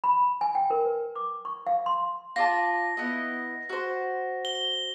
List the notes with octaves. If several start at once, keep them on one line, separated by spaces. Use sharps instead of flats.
B5
G#5
G5
A#4
B4
D6
C#6
F5
C6
F4 D5 A5 A#6
B3 E4 D#5
F#4 C5
G7